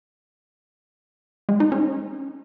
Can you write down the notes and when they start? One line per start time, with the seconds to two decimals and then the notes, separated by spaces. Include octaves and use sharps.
1.49 G#3
1.60 D#4
1.72 C#4